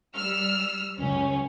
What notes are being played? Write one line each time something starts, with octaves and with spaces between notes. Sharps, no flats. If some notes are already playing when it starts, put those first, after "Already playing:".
G3 E6 F6
C#2 F#2 C#4